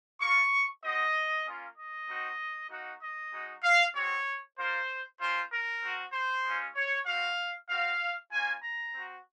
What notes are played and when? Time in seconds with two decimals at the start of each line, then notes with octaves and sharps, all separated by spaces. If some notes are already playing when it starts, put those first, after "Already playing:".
0.20 A#3 F4 C#6
0.82 C4 F#4 D#5
1.45 A#3 C#4 F4
1.76 D#5
2.07 C4 D#4 F#4
2.69 A#3 D#4 F#4
3.01 D#5
3.31 G#3 D#4 F#4
3.63 F5
3.94 G#3 C4 F#4 C#5
4.57 A#3 F4 C5
5.19 A#3 C#4 F4 C5
5.50 A#4
5.82 C4 F#4
6.13 C5
6.44 G#3 C#4 F4
6.75 C#5
7.06 C4 F#4 F5
7.69 C4 F#4 F5
8.31 A#3 C#4 F4 G#5
8.62 A#5
8.93 C4 F#4